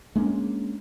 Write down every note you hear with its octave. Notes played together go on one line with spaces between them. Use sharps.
G#3 A#3 C#4 D4